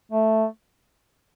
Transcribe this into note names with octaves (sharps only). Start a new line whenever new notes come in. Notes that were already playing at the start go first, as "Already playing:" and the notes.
A3